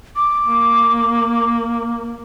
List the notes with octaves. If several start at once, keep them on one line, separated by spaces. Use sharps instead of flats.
D6
A#3